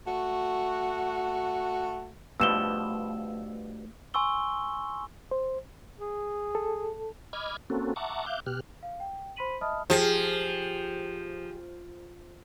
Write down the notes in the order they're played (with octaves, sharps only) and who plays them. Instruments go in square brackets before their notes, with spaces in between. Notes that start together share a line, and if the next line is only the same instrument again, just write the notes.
[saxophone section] A3 F#4
[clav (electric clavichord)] G2 B2 F3 [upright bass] A3 [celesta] E6 E7 G7
[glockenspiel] G#5 C6 C#6 E6 G7
[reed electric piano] C5
[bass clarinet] G#4
[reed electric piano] A4
[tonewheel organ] D#5 B5 D6 F6 G#6
A#3 C4 C#4 F#4 A4
E5 F#5 A5 A#5 C#6 D6
E5 F5 D6 F#6 G6
B2 G4 F6 F#6
[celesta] F5
G5
C5 B5 C6 B6 D#7 F#7
D#5 E5 A5 B5 D#6 F6
[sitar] F3 [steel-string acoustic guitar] G4 G#4